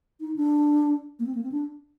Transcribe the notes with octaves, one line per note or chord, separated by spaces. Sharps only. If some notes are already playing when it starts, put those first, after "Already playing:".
D#4
D4
A#3
C4
A#3
C4
D4